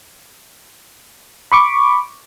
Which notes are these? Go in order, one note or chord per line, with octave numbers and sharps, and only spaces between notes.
B5 C#6 D6